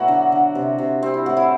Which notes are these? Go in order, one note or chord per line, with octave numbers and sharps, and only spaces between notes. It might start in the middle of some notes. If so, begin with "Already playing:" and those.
Already playing: B2 F#3 A3 E4 F#4
D3
D3
C3
C3
G3 C4
E4
A2 F#4
E4